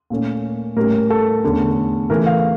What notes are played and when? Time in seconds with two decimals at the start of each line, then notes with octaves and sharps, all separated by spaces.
0.10 A#2 A3 C#4
0.76 A2 G3 C#4 A#4
1.10 A4
1.43 E2 D3 A3 C#4
2.09 C#3 E3 A3 A#4
2.26 F5